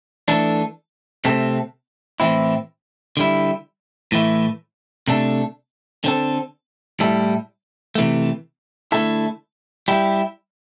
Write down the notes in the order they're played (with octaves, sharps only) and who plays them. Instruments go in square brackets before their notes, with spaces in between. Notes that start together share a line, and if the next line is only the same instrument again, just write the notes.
[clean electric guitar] E3 A3 D4 A4
C3 A3 C4 A4
A2 E3 C4 E4
D3 G3 E4
A2 E3 A3 E4
C3 A3 D4 A4
D3 C4 A4
A2 G3 E4 A4
C3 E3 A3
D3 A3 E4 A4
G3 E4 G4